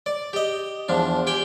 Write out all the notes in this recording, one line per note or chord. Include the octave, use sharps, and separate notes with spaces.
D5
G4 D#5
E2 F3 D4
G4 G5 G#5